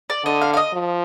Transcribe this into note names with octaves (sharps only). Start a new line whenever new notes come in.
D5
D3 D#5
F5
F5
D#5
F3